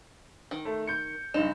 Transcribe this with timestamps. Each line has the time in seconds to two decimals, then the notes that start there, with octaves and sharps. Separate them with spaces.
0.51 D#3
0.65 A3
0.87 G6 C#7
1.34 F#1 G2 D#4 E7